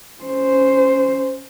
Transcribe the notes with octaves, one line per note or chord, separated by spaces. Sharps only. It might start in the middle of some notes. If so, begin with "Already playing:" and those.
C#4 C5